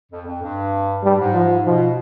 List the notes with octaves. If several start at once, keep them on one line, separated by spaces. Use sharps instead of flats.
F2
F2
G2
G2 G3
G#2
F3
B2 F3